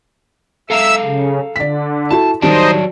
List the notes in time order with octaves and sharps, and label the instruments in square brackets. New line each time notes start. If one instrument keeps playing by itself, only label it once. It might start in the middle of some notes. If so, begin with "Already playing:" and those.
[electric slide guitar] A4 F5 A#5 [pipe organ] E5 E6
[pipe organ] C#3
[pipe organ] D3 [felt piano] D5 B6
[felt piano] E4 F#4 A4 [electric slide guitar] A5
[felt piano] D#3 G3 [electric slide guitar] F#3 D5 A5 [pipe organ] D#4 C5 D#5